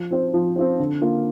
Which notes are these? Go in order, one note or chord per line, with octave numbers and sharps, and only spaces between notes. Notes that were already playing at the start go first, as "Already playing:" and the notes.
Already playing: F3
C4 F4 C5
F3
C4 F4 C5
D3
A#3 F4